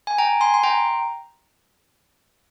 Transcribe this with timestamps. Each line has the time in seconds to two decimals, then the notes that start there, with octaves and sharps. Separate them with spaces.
0.07 G#5
0.18 G5 A#5
0.41 G#5 C6
0.54 C6
0.63 G5 A#5